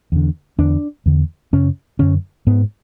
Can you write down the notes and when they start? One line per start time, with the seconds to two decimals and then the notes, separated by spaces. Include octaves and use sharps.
0.12 E2 D3
0.58 E2 D3 D4
1.06 E2 D3
1.53 F#2 C#3 C#4
1.99 F#2 D3 C#4
2.47 G#2 B3